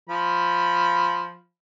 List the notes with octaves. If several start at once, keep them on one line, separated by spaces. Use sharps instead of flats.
F3 B5